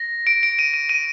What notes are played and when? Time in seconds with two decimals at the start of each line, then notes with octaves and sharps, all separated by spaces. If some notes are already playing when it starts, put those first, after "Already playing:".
Already playing: A#6
0.27 D7
0.43 D7
0.59 D#7
0.74 D#7
0.89 D#7